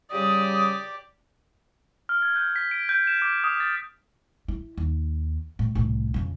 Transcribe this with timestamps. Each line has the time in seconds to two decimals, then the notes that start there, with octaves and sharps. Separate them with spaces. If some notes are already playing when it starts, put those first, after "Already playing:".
0.12 C#3 G3 G4 D5 D#6
2.09 F6
2.22 G#6
2.36 G6
2.56 B6
2.71 D7
2.89 G6
3.07 E7
3.22 D6
3.44 D#6
3.60 A6
4.48 E4
4.77 D#2
5.59 A2
5.75 C2 A2
6.14 F2 C#3